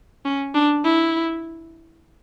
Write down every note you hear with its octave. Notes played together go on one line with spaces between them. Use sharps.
C#4
D4
E4